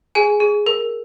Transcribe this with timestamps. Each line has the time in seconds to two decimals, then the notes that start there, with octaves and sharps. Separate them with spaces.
0.15 G#4 G#5
0.40 G#4
0.66 A#4